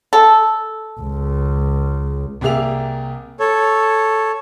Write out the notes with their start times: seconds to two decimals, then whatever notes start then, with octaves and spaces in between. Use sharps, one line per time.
0.13 A4
1.01 C#2
2.41 C2 A#3 G4 G#4 E5 F7
3.40 A4 C#5